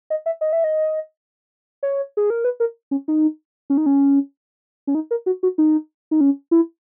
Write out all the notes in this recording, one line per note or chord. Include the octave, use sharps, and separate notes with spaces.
D#5
E5
D#5
E5
D#5
C#5
G#4
A#4
B4
A#4
C#4
D#4
C#4
D#4
C#4
C#4
D#4
A#4
F#4
F#4
D#4
D#4
C#4
E4